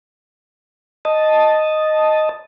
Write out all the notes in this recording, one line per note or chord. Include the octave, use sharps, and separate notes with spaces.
D#5 A5